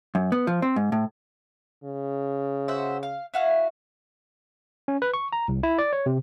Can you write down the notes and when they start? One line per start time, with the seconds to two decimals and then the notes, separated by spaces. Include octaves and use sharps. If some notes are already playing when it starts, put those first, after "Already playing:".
0.15 F#2
0.32 B3
0.47 F3
0.62 C4
0.76 G#2
0.92 A2
1.84 C#3
2.68 F#4 C5 E5
3.03 F5
3.34 E4 F#4 F5
4.88 C#4
5.02 B4
5.14 C#6
5.33 A#5
5.48 C2
5.63 E4
5.78 D5
5.93 C#5
6.06 C3